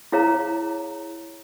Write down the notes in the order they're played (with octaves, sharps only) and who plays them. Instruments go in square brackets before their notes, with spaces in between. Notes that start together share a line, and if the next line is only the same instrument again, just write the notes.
[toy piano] E4 G#4 C#5 F5 A#5